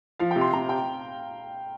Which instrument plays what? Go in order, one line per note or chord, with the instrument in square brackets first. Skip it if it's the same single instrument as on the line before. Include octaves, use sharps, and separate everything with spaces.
[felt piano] F3 [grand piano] F5
[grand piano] G5
[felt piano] C3
[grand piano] C6
[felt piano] C3 [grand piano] A#5
[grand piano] G5